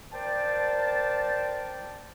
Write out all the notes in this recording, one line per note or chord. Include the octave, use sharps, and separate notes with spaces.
A#4 C5 D5 G5 A5